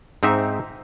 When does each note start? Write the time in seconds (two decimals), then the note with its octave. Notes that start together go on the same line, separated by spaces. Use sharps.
0.23 G#2 C4 D#4 E5